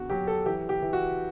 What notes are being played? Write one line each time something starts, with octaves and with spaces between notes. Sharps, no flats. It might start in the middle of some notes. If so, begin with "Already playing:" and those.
Already playing: E2 D3 F#4
F#3 G4
A4
E3 G4
G4
E3
F#4